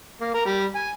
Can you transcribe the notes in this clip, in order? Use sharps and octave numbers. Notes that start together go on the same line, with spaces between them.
A#3
A#4
G3
G#5